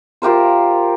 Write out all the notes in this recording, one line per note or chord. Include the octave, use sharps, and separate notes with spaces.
F4 G4 A#4 C5